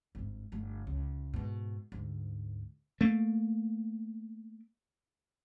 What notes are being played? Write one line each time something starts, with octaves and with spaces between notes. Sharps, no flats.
G#1 G2
G1 A3
C#2
G#2 B2
D2 G#2
A3 A#3